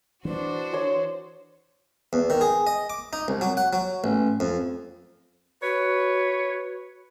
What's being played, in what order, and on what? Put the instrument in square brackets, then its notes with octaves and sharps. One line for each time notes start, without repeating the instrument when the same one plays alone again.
[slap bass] E3 [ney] D4 [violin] F#4 C5
[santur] C#5 D#6
[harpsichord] E2
D#3
G#4
D#5
D6
D#4
C2
F#3
F#5
F#3
A1
F2
[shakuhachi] F#4 [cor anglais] B4 [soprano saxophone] C#5